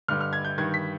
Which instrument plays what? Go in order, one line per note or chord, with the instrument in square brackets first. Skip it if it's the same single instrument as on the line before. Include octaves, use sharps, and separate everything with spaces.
[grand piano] G2 D3 F6
F6
G#6
G6
G2 D#3 G#6
B6